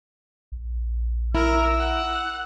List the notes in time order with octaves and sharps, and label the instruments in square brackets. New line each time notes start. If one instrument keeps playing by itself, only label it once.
[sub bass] A#1
[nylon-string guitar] E4 [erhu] A#4 [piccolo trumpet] E6
[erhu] F#5